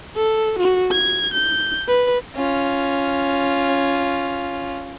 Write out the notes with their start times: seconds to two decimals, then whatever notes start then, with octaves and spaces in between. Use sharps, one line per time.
0.16 A4
0.59 F#4
0.92 G#6
1.33 G6
1.88 B4
2.36 C#4 F4